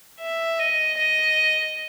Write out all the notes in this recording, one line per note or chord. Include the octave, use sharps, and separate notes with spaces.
E5
D#5
D#5